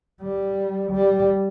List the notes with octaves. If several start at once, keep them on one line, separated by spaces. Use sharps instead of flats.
G3
G3